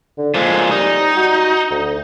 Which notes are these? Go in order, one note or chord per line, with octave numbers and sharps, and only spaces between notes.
D3
A#2 F3 G#3
G3 D#4
F#4
D2